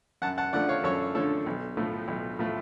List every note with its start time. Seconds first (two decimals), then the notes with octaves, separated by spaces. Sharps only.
0.22 F#2 F#5 A5
0.38 F#5 A5
0.53 D3 F3 A3 D5 F#5
0.69 C#5 F5
0.84 F#2 A4 C#5
1.15 D3 F3 A3 A4 C#5
1.46 B1
1.77 A2 F3 A3
2.08 B1
2.39 A2 F3 A3